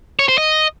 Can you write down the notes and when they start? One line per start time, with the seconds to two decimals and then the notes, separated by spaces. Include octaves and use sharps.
0.19 C#5
0.29 C5
0.38 D#5